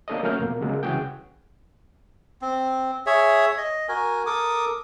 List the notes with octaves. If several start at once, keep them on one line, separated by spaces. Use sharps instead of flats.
A#3 D4 A4 C#5 D#5
F#3 A3 C#4 A#4 F6 G6
F2 B2 A#3
C#3 F#3 G#3 A#3
C2 C#3 E3 F#4 G#4 G5
C4
G#4 C#5 E5
D#5
F#4 A#4 G#5
A4 A#4 D6 D#6